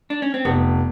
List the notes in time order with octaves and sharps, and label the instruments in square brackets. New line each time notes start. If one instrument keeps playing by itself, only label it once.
[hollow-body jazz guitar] D4
C#4
C4
[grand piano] F1 [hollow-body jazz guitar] B3